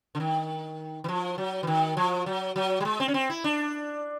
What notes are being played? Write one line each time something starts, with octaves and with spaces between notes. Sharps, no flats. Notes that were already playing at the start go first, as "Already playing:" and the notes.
D3
D#3
E3
F3
F#3
E3
D#3
F3
F#3
F#3
G3
G#3
C4
C#4
C4
E4
D4